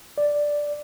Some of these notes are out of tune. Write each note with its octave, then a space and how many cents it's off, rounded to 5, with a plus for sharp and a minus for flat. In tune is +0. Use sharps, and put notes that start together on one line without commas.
D5 +0